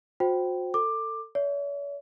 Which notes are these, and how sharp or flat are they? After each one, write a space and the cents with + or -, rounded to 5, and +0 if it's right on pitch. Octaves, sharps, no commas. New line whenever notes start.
F#4 -35 C5 +0 G5 -15
A4 +25 D6 +15
C#5 +45 E5 -10